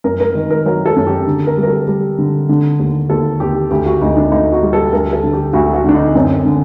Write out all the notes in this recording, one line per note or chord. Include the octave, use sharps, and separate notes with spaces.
F#2 A#4
A#4
D#3
A#4
F#3 A#4
A4
F#2
G4
D3
A#4
G3
A#4
A4
G3
D3
D3
D#2
D#2 A4
D#2 G4
D2 G4
F#4
D2 D#4
D4
D2 D#4
F#4
G3
A4
D2 A#4
A4
D3
G4
D2 F#4
F#4
D3 D4
D#4
F#2 C4
D3